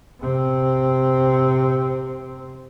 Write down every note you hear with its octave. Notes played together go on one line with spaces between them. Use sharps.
C3 C4